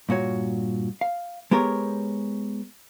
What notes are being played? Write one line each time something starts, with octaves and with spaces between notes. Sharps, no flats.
G2 A#2 F#4 C#5
F5
G#3 B3 G4 A#4 C5 C#5